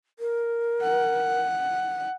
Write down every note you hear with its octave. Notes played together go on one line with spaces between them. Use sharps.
A#4
F#5